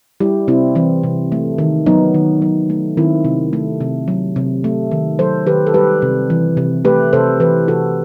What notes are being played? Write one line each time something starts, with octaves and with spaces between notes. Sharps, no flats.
G3 E4 G4
C3 C4 E4
E3 C4
C3
A3
D#3
F#3 B3 D#4
D#3
F#3
A3
D#3 C4 E4
C3
A3
C3
F#3
C3
A3
D#3
F#3 A4 C5
D#3 G4 B4
A4
G3 G4 B4
C3
E3
C3
A3 G4 B4
C3 A4 C5
E3 G4 B4
C3 F#4 A4